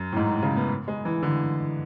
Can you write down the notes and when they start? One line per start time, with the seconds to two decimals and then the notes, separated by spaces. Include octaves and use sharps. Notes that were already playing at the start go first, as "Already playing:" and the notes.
Already playing: F#2
0.12 A2
0.17 G#2
0.30 A2
0.42 C#3
0.57 B3
0.88 G#3
1.05 E3
1.23 D3